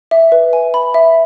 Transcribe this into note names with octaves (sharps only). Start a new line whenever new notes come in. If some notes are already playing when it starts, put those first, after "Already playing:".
E5
B4
G#5
B5
E5